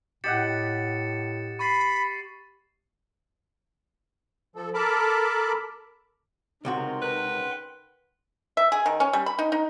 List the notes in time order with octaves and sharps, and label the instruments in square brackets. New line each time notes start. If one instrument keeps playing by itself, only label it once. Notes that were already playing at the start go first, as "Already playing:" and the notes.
[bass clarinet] A2 [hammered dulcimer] G4 D#5 F#5 [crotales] A6 C#7 E7
[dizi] B5 [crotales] C#6 A6 C7
[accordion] F3 A4
A4 A#4 A5 B5 D6
[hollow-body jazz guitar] C#2 C3 F#4 [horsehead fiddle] D#4 A#4 [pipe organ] F#5 G5 C6
[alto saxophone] B4
[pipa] E5
G#4
D#3
C#4
G3
B5
D#4
D#4